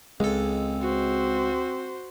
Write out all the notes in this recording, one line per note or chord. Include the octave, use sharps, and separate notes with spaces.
C#2 G#3 C4 A4
F#4 C5